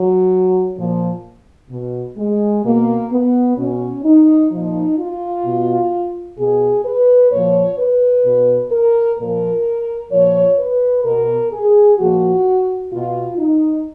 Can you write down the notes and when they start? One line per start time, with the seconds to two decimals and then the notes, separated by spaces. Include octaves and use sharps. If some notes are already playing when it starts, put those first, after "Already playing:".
Already playing: F#3
0.77 A#2 F3
1.70 B2
2.17 G#3
2.64 B2 A#3
3.11 B3
3.57 B2 C#4
4.03 D#4
4.51 A#2 F3 D#4
4.98 F4
5.44 B2
6.38 B2 G#4
6.84 B4
7.31 A#2 F3 C#5
7.78 B4
8.24 B2
8.71 A#4
9.18 A#2 F3 A#4
10.11 A#2 F3 C#5
10.58 B4
11.04 B2 A#4
11.52 G#4
11.98 A#2 F3 F#4
12.92 B2 F4
13.38 D#4